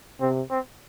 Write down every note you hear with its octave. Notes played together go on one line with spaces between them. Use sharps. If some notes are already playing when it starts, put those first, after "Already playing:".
C3 C4
C4